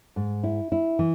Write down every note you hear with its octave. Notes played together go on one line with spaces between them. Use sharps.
G#2
E4
E4
E3